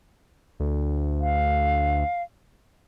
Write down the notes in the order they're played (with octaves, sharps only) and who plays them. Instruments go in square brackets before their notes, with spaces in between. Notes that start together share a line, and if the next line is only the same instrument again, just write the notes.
[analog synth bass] D2
[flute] F5